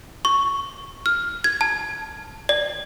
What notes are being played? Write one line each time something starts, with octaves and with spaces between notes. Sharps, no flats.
C#6
F6
G#6
A5
D5